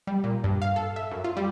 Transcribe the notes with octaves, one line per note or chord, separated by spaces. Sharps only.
G3
A#2
G2
F5
A4
E5
F#2
F4
G3